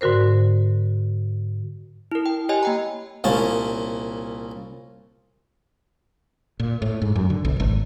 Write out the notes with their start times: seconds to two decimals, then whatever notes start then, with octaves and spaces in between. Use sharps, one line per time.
0.01 G#2 D3 F#4 A#4 C5
2.12 E4 A#4
2.26 G5
2.49 G4 C#5 D#5 G#5
2.63 A#3 G5 A#5
3.24 C2 A#2 C#4 A5
6.60 A#2
6.82 A2
7.02 G#2
7.16 F#2
7.30 D3
7.45 B1
7.60 G#1